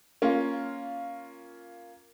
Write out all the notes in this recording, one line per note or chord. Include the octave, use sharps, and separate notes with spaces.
A#3 C#4 F4